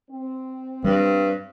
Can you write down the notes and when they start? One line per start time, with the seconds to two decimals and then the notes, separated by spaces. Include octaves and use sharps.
0.11 C4
0.84 G2 G3